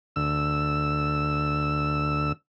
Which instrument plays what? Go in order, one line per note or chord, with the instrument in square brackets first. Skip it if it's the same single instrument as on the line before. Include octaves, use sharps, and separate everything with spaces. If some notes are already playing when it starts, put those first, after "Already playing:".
[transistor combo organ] D2 E6